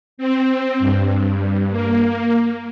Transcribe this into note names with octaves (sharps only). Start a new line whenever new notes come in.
C4
G2
A#3